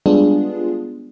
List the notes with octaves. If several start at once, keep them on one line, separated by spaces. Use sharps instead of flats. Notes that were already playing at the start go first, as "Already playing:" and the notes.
G3 G#3 B3 D4 F4 G#4